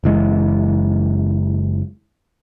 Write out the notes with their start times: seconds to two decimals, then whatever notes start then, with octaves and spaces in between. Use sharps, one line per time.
0.04 F#1 E3 G#3